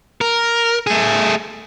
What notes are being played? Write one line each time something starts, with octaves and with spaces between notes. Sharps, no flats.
A#4
A3 G#4